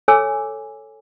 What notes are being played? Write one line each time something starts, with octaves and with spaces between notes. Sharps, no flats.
A4 C#5 G#5 D6 E6